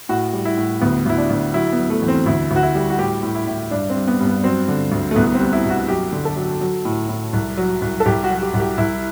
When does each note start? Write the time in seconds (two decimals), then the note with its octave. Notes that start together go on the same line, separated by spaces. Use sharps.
0.09 A2 F#4
0.33 G3
0.45 E4
0.57 A2
0.81 D2 B3
1.06 D2 E4
1.18 D4
1.30 D2
1.54 F#3 E4
1.72 B3
1.78 F#3
1.90 A3
2.02 E2
2.08 C4
2.26 D2 E4
2.51 D2
2.56 F#4
2.63 E4
2.75 G3
2.90 F#4
2.98 A2 G4
3.23 A2
3.35 E4
3.47 A2
3.71 G2 D4
3.89 C4
3.95 G2
4.07 B3
4.20 G2
4.25 B3
4.44 F#3 C4
4.68 D3
4.92 D2
5.11 A3
5.16 C2 B3
5.34 C4
5.40 G3
5.52 E4
5.64 B2
5.70 F#4
5.88 F#2 G4
6.12 D3
6.25 A4
6.36 F#3
6.61 F#3
6.85 A2
7.09 A2
7.33 C2
7.57 F#3
7.82 C2
8.00 A4
8.06 C2 G4
8.24 F#4
8.30 F#3
8.37 F#4
8.42 G4
8.54 C2
8.60 G4
8.78 C2 E4